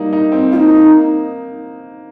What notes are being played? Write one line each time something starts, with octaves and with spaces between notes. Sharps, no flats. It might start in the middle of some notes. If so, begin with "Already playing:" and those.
Already playing: G3 A#3 D#4
D#4
C4
A#3 D#4 F4